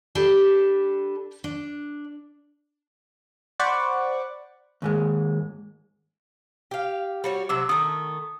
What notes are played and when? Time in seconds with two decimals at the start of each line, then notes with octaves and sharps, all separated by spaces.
0.15 D4 G4 A4 B4
1.44 D4
3.59 C5 D5 F#5 B5 C#6 D6
4.82 D#2 G#2 G#3
6.71 G4 F5
7.24 G3 F#4 C#5
7.49 C3 F#3 E5 D6 E6
7.69 D#3 A3 D#6